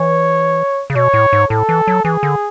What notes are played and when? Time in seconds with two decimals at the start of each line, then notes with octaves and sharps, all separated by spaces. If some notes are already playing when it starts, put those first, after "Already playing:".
Already playing: E3 C#5
0.90 C#3
0.95 B2 C#5
1.14 A2
1.33 G#2
1.50 A2 A4
1.69 E3
1.87 F#3
2.05 E3 G#4
2.23 D3